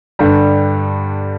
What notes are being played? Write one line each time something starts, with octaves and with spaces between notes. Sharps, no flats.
G2 D3 G3